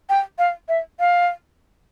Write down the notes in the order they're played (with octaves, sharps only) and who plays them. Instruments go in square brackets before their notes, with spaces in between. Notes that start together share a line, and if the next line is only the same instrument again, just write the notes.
[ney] G5
F5
E5
F5